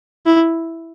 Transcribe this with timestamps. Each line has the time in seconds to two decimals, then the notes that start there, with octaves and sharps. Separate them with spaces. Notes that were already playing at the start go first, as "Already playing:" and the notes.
0.26 E4